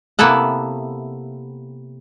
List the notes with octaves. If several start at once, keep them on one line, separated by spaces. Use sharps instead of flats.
C3 A#3 B3 E4 A4 F#5